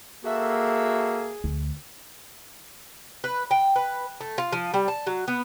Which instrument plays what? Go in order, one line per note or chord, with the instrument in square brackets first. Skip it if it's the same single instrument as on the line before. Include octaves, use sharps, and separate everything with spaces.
[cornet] A#3 [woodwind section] F#4 A4 E5 [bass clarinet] G#4
[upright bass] D2
[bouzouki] B4
G5
B4
A3
F4
F3
G3
A5
F#3
B3